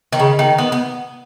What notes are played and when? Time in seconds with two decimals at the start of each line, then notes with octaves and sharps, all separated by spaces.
0.13 D#3
0.19 C#3
0.39 D#3
0.58 B3
0.72 B3